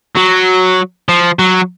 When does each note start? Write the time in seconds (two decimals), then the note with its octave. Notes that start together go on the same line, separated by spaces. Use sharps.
0.17 F#3
1.09 F3
1.39 F#3